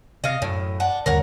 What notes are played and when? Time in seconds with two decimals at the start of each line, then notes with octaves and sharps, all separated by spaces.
0.24 C3 D#5 F5
0.42 F#2 A2
0.80 D4 F#5
1.06 G1 D#2 G3 A#4 C#5 F#5